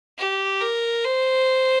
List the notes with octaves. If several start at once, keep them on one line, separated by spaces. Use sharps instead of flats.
G4
A#4
C5